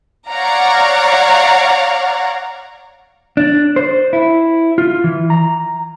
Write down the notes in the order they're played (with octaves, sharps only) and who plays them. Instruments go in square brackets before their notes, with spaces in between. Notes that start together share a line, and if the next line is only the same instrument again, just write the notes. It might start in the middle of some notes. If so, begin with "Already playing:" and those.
[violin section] C#5 D5 F5 F#5 A#5
[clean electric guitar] D4
C5
E4
F4
E3
A#5